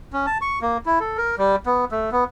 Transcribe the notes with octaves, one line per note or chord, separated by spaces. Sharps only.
C#4
A5
C#6
A#3
E4
A4
A#4
G3
B3
A3
B3